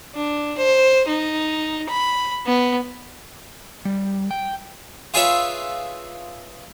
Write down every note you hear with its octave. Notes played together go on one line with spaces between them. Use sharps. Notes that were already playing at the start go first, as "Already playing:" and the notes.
D4
C5
D#4
B5
B3
G3
G5
F4 G#4 B4 C#5 E5